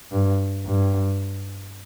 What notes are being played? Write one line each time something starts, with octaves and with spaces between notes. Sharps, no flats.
G2
G2